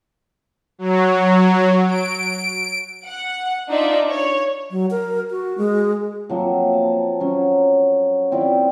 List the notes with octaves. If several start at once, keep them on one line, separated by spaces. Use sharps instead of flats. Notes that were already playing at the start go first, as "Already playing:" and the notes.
F#3
D7
F#5
D4 D#4 F4 D5 E5
C#5
F#3
A#4
F#4
G#3
F3 F#3 A#3 C4
A5
F#3 C#4
C4 E4 F4 D5